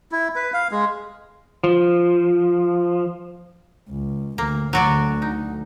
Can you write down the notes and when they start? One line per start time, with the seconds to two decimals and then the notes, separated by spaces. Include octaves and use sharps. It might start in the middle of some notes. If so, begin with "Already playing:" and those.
0.12 E4
0.36 B4
0.54 F5
0.71 G#3
1.64 F3
3.89 C#2
4.38 D2 A#3
4.73 D2 D3 F#3 F#4 D5
5.22 D#4